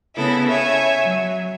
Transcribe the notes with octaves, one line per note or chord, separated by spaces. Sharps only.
C#3 B3 E4 A4
C#5 E5 G#5
F#3